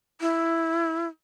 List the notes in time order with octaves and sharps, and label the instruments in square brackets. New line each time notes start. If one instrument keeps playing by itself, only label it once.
[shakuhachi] E4